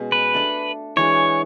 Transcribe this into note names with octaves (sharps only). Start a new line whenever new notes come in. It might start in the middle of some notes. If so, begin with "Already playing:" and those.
Already playing: B2 G#3 C#4
B4
A3 D4 A4
E3 G#3 D4 F#4 C#5